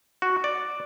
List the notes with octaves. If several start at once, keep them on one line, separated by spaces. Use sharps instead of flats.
F#4
D5